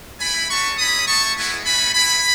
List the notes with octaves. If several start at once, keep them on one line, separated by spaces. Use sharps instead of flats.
A3 E4 G#5 B5
G#3 C#4 F#4 A5 C#6
G#3 C#4 E4 B5 D#6
A3 E4 A5 C#6
G#3 B3 E4
A3 C#4 F#4 G#5 B5
B3 E4 G#5 B5